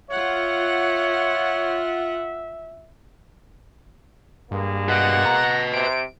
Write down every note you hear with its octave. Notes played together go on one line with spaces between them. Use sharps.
F4 C#5 E5 F#5
G2 G#3 A#3
B4 D#5 F#5
A#5
C3 D7